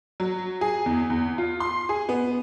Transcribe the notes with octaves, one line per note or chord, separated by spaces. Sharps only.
F#3
G#4
E2
E2
F4
C6
G#4
B3